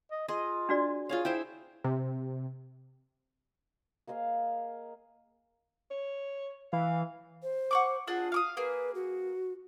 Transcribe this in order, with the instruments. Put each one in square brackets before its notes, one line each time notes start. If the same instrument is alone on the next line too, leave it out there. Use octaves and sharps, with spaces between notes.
[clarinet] D#5
[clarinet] F4 [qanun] G#4 D#5
[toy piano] D4 F#4 D5
[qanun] F4 G#4 F5 [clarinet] C#5
[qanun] E4 C5 E5 [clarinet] G5
[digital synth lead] C3
[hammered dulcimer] A#3 G#4 D#5 F5
[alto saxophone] C#5
[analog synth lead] E3 [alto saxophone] F5
[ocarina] C5
[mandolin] F#5 C#6 D6
[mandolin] D4 G#4 F#5 [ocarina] F4
[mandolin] F5 D6 D#6
[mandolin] A#3 G#4 [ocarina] B4
[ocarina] F#4